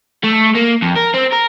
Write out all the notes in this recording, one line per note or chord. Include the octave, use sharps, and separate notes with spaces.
A3
A#3
F2
A#4
C4
A#4